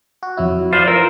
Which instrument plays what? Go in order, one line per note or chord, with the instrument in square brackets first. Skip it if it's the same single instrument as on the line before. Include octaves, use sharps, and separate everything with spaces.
[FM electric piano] F#4
F2 F#3 E4
[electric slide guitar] F4 C5 [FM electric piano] D5
[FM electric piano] E3 F3 E6 [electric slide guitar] A#4